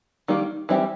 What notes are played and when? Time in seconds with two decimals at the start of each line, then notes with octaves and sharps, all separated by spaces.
0.28 D#3 G3 A#3
0.69 E3 G3 C4 E4 G4